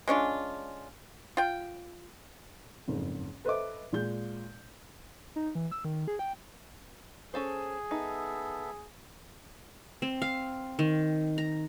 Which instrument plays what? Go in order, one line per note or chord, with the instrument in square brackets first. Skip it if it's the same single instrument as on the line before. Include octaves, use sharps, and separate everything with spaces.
[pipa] G#3 C#4 D4 F4
F4 G5
[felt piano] F#1 F2 G#2
A4 B4 C5 D#5 E5 D6
A#2 G#3 G6
[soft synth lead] D#4
E3
E6
D#3
G#4
G5
[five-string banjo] C#4 A4 C5 [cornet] G#4
[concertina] B3 A4 E5 [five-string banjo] D#4
[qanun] C4
F5
D#3
A#5